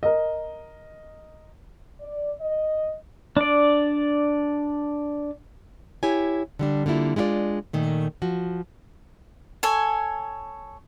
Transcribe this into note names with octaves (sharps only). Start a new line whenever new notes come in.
A#4 D#5
D5
D#5
D4 D5
E4 G4 C#5 G#5
D3 G3 D4
D3 G3 A#3 E4 F4
G#3 D4 E4 F4 D5
A#2 D#3 A3
F3 F#4
A4 C#5 G#5